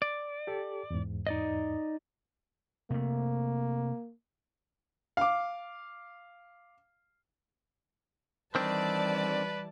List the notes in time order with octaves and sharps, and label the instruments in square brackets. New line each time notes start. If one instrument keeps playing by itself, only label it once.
[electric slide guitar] D5
[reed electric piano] G4 A4
E2 G#2
[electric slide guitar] D#4 D5 D#5
[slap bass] C3 A3 [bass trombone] A#3
[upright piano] F5 D6
[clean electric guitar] D#3 C4 D4 [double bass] E3 G3 [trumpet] B4 [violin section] D5 A5